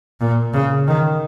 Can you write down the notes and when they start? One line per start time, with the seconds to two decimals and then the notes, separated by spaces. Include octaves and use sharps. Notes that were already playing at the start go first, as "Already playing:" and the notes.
0.21 A#2
0.53 C#3
0.87 D#3